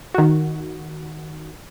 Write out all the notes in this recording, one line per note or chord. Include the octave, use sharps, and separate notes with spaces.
D#3 F#4